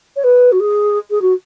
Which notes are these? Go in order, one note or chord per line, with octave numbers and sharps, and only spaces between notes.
C#5
B4
F#4
G#4
G#4
F#4